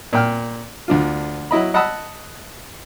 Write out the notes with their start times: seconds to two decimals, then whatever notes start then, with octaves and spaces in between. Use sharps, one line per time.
0.13 A#2 G5 F6
0.88 D2 D4 F4
1.51 F#3 E4 D#5 B5
1.74 D#5 F#5 A5 B5 D#6 E6